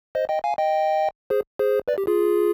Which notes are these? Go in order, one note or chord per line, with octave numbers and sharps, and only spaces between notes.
C5 D#5
D#5 G5
F5 G#5
D#5 G5
G#4 C5
G#4 C5
B4 D5
G4
F4 G#4